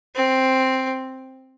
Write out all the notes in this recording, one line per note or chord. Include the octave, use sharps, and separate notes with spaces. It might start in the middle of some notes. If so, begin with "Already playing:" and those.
C4